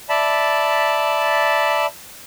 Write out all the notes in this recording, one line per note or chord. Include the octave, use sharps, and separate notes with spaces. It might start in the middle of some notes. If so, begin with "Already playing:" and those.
D5 E5 A5 B5